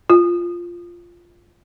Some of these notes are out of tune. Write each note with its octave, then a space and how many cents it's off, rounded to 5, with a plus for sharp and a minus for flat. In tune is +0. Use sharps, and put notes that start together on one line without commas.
F4 -5